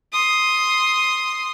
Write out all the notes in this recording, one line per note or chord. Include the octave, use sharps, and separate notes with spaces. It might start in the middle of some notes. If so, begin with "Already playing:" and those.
C6 D#6